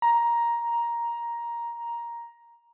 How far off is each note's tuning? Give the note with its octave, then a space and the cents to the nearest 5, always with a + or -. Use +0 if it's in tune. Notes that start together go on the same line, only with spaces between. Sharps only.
A#5 +10